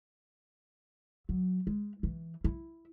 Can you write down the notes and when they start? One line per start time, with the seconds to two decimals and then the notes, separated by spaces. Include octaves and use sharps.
1.29 F#3
1.67 G#3
2.03 E3
2.44 E4